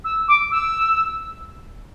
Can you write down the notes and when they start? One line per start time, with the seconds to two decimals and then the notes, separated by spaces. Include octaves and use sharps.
0.04 E6
0.28 D6
0.51 E6